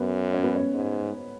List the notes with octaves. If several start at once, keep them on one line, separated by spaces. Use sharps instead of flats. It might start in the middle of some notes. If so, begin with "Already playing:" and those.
Already playing: F#2 B3
C#4
B3
C#4
G#2